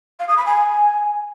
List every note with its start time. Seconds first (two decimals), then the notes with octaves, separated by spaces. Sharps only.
0.19 F5
0.28 D#6
0.37 B5
0.46 G#5